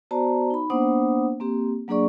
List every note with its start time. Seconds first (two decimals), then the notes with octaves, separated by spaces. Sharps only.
0.11 B3 F#4 C5 D5 A5 A#5
0.50 D#4 B5
0.70 A#3 B3 D4 C5 F#5 D#6
1.40 A#3 C4 G4
1.88 F#3 A#3 D4 G#4 D5 C#6